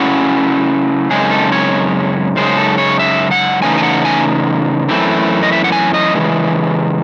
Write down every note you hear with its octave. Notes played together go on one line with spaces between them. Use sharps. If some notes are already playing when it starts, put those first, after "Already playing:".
Already playing: C#3 F#3 A3 C#4 E4 F#5
F#2 C#3 G#3 C4 D#4 G#4
A4
C#5
F#2 C#3 G#3 D#4 C5
A4
C#5
E5
F#5
C#3 E3 A3 D#4 G#5
G#5
F#5
G#5
F#2 E3 A3 C4
D#5
E5
F#5
G#5
D#5
C#3 E3 G#3